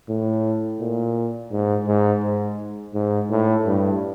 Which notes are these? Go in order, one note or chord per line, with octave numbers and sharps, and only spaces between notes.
A2
A#2
G#2
G#2
G#2
G#2
A2
G2